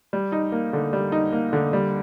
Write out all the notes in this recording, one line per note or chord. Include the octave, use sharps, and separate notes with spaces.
G3
D#4
A#3
D3
G3
D#4
A#3
D3
G3